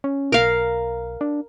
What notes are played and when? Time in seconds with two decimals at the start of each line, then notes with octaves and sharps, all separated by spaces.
0.04 C#4
0.32 B1 A#4 F5
1.21 D4